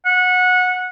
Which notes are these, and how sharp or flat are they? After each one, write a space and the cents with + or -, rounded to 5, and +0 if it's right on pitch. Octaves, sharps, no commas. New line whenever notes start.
F#5 -20